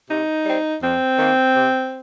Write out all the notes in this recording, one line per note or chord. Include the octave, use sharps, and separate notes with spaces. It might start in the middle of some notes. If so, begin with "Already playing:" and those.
C3 D#4
G3 C4
F2 C4
D#3 A#3
C3